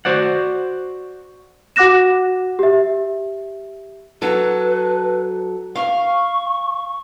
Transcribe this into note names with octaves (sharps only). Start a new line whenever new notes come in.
F#4 C5 D5 F#5
F#4 F#5 D6 F#6 A#6 E7
G4 E5
F#3 A4 B4
F5 C#6